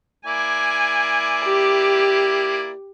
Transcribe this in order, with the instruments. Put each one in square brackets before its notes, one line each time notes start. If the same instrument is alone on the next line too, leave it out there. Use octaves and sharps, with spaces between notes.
[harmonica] A#3 E4 D5 [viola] G#5
[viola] G4